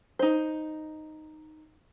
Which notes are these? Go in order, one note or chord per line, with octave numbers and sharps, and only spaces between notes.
D#4 C5